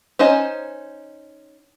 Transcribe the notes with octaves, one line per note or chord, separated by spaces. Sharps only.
C#4 D#4 C5 D#5 G#5